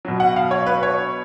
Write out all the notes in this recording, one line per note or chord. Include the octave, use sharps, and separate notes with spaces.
B2 F#3
F#5
F5
C#5
B4
C#5